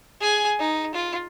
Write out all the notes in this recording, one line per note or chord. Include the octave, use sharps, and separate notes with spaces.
G#4 G#5
D#4
F4